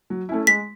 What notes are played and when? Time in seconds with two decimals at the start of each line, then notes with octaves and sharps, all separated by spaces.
0.10 F#3
0.29 A3 C#4 E4
0.47 G#3 B6